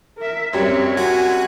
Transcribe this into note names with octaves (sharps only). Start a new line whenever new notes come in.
A#4 E5
F#2 G3 C4 C#5
F#4 G#5